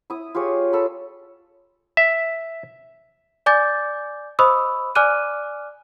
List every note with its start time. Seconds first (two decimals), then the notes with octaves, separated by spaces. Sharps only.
0.10 E4 D#6
0.35 F4 G4 G#4 C#5
0.73 A4 B5
1.97 E5
3.46 D5 G#5 D6 G6 A6
4.39 C5 D#5 B5 C#6 D#6 E6
4.95 D5 G#5 D6 F6 F#6 D#7